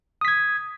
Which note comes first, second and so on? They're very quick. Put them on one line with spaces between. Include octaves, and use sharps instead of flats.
D#6 B6 G#6